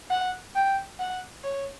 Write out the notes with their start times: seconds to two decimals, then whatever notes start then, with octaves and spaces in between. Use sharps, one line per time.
0.11 F#5
0.56 G5
1.00 F#5
1.44 C#5